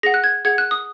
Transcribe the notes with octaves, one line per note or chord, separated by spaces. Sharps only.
G#4 F#5 A#6
F#6
G#6
G#4 F#5 G#6
F#6
D#6